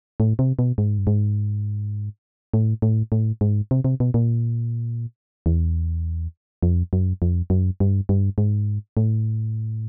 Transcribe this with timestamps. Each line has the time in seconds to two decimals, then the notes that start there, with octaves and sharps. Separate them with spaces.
0.20 A2
0.39 C3
0.59 B2
0.78 G#2
0.98 G2
1.07 G#2
2.54 A2
2.82 A2
3.12 A2
3.41 G#2
3.71 C3
3.84 C3
4.00 B2
4.14 A#2
5.46 E2
6.63 F2
6.93 F#2
7.22 F2
7.50 F#2
7.80 G2
8.09 G2
8.38 G#2
8.97 A2